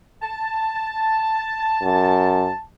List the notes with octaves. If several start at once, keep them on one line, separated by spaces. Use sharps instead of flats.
A5
F#2